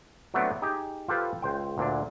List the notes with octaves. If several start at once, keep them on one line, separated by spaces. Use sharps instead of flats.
F#3 A3 B3 C4 D4
D#4 G4 G#4
F4 G4 A4 B4 C5
C#2 C5 G5
D2 A#2 D3 D4